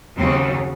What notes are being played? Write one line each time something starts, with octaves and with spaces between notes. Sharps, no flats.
D#2 C#3 F#3 C4